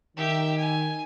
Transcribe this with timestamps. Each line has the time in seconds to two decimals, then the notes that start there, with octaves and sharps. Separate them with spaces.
0.17 D#3 G4 E5
0.57 G#5